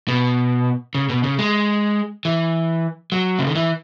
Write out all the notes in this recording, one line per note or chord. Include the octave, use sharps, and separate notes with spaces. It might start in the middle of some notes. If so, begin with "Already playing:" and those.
B2
C#3
B2
C#3
G#3
E3
F#3
C#3
D#3
E3